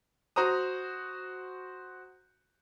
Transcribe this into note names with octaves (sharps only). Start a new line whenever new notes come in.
F#4 C5 A#5 D#6